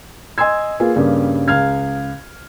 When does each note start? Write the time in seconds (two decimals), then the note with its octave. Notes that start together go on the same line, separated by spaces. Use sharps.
0.38 D#5 G#5 C6 E6 G#6
0.80 A#3 F4 G#4 B4 F5
0.96 G2 C#3 G3 A#3
1.48 C#2 F5 F6 G#6